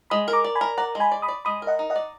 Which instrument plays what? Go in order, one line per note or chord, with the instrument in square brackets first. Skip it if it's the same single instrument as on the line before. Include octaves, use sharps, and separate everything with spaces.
[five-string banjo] G#3 [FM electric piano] B5 D#6
[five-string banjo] A#4
[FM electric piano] A#5 D6
[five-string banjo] D5
[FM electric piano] G#5 B5
[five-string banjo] A#4
[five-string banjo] D5 [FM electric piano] F#5 A#5
[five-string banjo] G#3
[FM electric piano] G#5 B5
[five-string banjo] D5
[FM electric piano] B5 D#6
[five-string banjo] D5
[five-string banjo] G#3 [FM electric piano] B5 D#6
[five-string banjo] A#4
[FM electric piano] D#5 F#5
[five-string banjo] D#4
[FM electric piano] D#5 F#5
[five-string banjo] D5